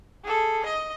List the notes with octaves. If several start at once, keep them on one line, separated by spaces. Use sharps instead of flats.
G#4 A4
D#5